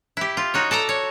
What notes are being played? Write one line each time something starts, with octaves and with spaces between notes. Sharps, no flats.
E4 G4
F4
D#4 F#4 C#5
A4 D5 A5 A#5
C#5